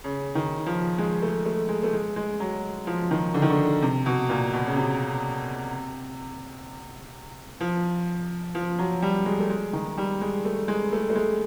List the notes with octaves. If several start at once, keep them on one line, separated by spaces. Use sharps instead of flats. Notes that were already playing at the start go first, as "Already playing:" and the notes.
C#3
D#3
F3
G#3
A3
A3
G#3
A3
G#3
G#3
F#3
F3
D#3
D3
D#3
D3
C3
B2
A#2
B2
C#3
C3
F3
F3
F#3
G3
G#3
A3
G#3
D#3
G3
G#3
A3
G#3
A3
A3
G#3